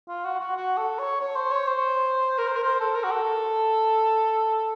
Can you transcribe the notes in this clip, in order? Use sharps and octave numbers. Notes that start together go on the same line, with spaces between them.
F4
F#4
F#4
F#4
A4
C#5
C#5
C5
C#5
C5
A#4
C5
A#4
C5
A4
A#4
F#4
A4